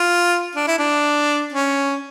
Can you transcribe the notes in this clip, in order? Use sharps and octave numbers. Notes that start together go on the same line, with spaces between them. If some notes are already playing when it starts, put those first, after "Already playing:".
Already playing: F4
D4
E4
D4
C#4